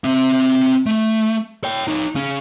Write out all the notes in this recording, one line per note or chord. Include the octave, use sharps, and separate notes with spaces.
C4 E5
A3
C#5 G5
D#4 C#5
C#3 C#4